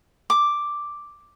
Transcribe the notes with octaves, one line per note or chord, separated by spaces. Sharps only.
D6